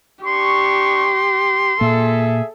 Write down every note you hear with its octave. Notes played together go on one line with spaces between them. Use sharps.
D4 G4 C6 C#6
A#2 A#3 G#4 A4 E5